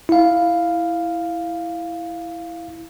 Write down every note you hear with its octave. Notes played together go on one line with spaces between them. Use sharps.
E4 F5